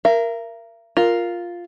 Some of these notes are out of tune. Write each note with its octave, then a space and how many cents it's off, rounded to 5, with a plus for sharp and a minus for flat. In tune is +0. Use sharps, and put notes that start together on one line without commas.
A#4 +0 E5 +45
F4 +0 A#4 +0